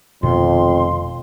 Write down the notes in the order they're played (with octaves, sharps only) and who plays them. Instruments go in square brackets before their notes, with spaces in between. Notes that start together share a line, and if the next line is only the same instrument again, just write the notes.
[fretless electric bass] F1 B2 D#3 [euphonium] F2 [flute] C6